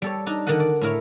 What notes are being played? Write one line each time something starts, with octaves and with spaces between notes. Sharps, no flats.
G3 A4 C#5
D4 D#4 A#5
D3 D#3 D4 D#5 F#5
D5
A2 E4 A#4 C#5